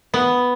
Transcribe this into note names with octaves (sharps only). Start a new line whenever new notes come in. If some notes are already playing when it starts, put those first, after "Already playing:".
B3